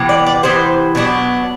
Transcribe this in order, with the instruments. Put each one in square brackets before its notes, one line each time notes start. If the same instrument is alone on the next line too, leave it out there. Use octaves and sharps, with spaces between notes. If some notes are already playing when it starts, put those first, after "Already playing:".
Already playing: [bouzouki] C3 E3 B3
D5
D5
C3 E3 B3 C5
B2 F#3 B3 D4